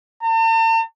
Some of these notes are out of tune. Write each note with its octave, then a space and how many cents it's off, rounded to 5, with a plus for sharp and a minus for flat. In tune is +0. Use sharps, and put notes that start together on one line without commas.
A5 +45